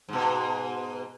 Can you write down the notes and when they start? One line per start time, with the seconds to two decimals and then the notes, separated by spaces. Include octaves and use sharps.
0.09 G#2 B2